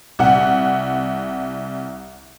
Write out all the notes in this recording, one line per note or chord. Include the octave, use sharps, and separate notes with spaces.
C2 F#5